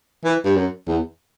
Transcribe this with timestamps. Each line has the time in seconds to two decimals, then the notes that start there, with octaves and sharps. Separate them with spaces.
0.25 E3
0.45 G2
0.56 F#2
0.87 E2